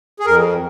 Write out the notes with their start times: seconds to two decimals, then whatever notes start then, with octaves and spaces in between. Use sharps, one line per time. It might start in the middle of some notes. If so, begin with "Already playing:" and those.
0.20 G#4
0.26 F2 A#4